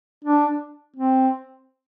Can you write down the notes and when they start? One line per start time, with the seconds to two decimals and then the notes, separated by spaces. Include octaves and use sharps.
0.24 D4
0.96 C4